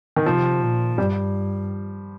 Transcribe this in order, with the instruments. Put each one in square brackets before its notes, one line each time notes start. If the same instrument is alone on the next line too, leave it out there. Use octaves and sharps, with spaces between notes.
[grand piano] D#3
[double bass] C3 [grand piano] F3
[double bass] A#2
[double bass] G2 [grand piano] G3